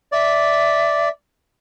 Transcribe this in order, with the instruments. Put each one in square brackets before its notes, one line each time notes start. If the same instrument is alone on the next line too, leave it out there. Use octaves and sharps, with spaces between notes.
[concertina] D5 [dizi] E5